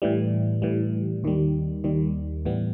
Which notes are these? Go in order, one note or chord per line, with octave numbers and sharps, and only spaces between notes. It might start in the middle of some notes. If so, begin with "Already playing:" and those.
A2 E3 G3
A2 E3 G3
D#2 D#3 G3
D#2 D#3 G3
A2 E3 G3 B3